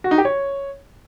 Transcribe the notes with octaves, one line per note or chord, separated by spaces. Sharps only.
F#4
D#4
G4
C#5